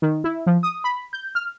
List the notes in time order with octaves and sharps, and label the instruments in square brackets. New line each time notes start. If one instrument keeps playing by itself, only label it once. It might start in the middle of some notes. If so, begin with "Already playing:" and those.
[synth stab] D#3
E4
F3
D#6
B5
G6
F6